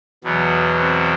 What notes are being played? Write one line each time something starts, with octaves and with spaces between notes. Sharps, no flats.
E2 B2 F#3
C4